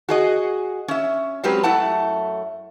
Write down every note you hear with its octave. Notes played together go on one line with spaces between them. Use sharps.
F#4 G#4 D#5
C#4 E5
F#3 G#3 C4 C#4 G4 B4
F#2 A3 E4 F#5 A5